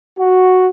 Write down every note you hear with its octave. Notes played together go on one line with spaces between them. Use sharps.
F#4